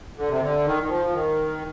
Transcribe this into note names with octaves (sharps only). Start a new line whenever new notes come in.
D3
C3
D3
D#3
D#3
F3
D#3